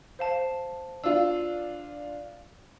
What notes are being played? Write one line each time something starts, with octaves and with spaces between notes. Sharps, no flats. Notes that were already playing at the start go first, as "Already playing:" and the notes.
C5 F5 A5
D4 F4 E6